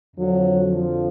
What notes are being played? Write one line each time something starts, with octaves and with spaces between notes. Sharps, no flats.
F2 D3 F3 F#3
F3